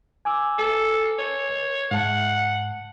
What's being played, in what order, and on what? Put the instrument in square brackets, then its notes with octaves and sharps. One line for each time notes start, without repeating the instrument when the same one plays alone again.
[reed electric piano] G#5 D6 E6
[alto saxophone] A4
C#5
[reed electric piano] G#2 A5 [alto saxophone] F#5